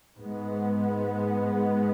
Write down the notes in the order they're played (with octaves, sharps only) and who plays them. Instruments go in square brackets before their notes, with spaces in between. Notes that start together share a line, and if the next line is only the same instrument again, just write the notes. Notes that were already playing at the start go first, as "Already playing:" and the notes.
[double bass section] G#2 G#3 B3